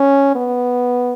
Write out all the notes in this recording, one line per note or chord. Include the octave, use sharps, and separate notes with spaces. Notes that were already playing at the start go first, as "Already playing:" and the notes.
Already playing: C#4
B3